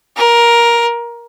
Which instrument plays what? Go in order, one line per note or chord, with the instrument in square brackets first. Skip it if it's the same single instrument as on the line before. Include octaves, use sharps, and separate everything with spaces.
[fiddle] A#4